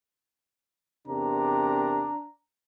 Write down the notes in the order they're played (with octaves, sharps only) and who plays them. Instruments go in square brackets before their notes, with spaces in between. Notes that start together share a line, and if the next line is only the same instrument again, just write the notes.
[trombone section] E2 C3 A#4 [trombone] D4 [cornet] A#5